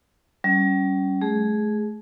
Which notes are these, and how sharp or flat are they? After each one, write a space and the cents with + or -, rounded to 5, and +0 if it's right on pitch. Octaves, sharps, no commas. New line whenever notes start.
G3 -35 C#4 +0
A3 -40 G#4 +0